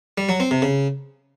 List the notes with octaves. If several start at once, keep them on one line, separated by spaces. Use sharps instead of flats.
G3
F#3
C4
C3
C#3